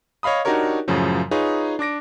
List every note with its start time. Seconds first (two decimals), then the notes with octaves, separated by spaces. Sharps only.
0.23 C#5 D#5 F5 B5 D#6
0.45 D4 D#4 F#4 G4 A#4 C#5
0.88 F#2 A2 C#3 F3 F#3
1.31 D#4 F4 G#4 B4 C#5
1.79 D4 D6 A#6 D7